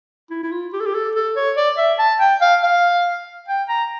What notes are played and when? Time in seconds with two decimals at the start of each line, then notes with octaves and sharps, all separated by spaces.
0.30 E4
0.43 E4
0.52 F4
0.73 G4
0.80 A4
0.86 G4
0.94 A4
1.15 A4
1.36 C#5
1.57 D5
1.78 E5
1.99 A5
2.20 G5
2.41 F5
2.63 F5
3.48 G5
3.69 A#5